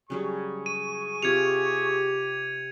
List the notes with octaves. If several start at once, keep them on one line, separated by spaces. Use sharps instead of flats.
C#3 F#3 G3 G#4 C#6
D#7
C3 F4 G4 G#6 C#7 F7